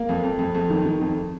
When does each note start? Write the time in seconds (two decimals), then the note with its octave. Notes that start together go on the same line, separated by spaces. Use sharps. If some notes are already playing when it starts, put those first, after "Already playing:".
Already playing: A#3
0.09 F2
0.24 F2
0.39 F2
0.55 F2
0.70 D#3
0.86 D#3
1.01 F2